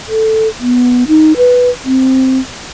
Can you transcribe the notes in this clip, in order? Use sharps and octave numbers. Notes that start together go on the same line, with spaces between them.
A4
B3
D#4
B4
C4